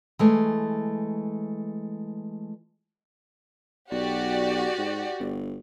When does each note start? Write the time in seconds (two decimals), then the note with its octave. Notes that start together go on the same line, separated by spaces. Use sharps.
0.19 E3 G#3 A3
3.92 B1 F#4 G4 D5
4.78 G#2
5.19 G1